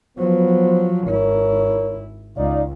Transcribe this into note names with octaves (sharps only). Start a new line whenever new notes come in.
F3 F#3 B3 C5
G#1 E4 A#4 C#5
C#2 D#4 D5 F5